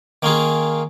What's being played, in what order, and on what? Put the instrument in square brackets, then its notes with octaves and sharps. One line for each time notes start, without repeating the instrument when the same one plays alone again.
[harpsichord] D#3 A#3 C#4 F4 G#4